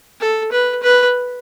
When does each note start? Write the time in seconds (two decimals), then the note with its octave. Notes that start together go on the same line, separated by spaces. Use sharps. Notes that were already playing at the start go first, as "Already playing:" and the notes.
0.21 A4
0.52 B4
0.83 B4